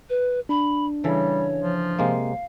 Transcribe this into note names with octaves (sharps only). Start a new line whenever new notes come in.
B4
D4 B5
C#3 E3 G3 A4 C#5
F3
C3 G#3 A#3 F5